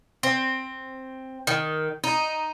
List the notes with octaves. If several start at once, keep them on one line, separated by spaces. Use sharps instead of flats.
C4
D#3
D#4